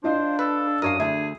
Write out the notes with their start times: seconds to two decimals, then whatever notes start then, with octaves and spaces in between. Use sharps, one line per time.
0.04 D4 F4 C5 D#5 F5
0.39 A4 B4
0.82 F#2 A#4 C#5 F5 D#6
1.00 D2 G#4 E5